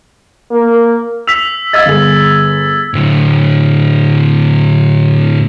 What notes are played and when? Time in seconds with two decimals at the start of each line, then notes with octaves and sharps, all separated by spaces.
0.51 A#3
1.27 E6 B6 F7
1.73 D#5 F5 E6 G#6 A6
1.86 G1 G#4
2.94 A2 D3